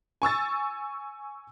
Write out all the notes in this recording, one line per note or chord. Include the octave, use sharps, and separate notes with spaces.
G#5 C#6 E6 A6